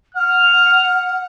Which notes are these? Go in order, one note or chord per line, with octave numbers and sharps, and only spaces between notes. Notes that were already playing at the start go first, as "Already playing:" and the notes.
F#5 F6